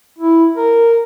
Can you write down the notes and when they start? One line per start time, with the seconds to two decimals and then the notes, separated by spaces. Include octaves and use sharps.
0.19 E4
0.57 A#4